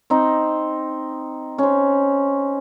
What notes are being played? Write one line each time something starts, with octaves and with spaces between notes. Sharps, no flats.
C4 D#4
C#4 C5